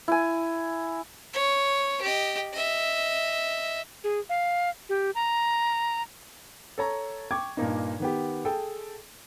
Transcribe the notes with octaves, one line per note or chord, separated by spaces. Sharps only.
E4 G#5
C#5
G4 D#5
D#5 E5
G#4
F5
G4
A#5
A4 C#5 A#5
G5 C#6 D6 G#6
G2 A#2 A#3 D#4
D#3 B3 G4
G#4 A4 G5